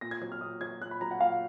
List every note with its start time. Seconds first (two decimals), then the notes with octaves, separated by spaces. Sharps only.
0.01 A#2 A#6
0.11 G#6
0.22 F#3 G#6
0.32 F6
0.41 A#2 D#6
0.61 F#3 G#6
0.81 A#2 F#6
0.91 B5
1.01 F#3 A#5
1.11 F#5
1.21 A#2 F5